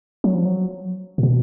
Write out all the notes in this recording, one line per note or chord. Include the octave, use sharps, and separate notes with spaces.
F#3
F3
F#3
A#2
B2